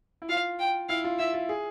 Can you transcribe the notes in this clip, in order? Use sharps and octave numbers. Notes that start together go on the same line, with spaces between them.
E4
F4 F5
G5
E4 F5
F4
E4 E5
F4
G#4